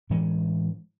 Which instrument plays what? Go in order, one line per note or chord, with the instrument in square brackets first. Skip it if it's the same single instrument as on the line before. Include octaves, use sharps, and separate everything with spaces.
[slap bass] A2 E3 G#3 C#4